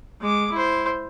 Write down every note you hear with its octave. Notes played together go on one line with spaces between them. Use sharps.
G#3 D6
E4 C5